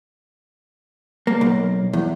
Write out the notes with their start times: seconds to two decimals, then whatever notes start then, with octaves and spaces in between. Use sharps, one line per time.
1.27 A#3
1.41 B1
1.93 E2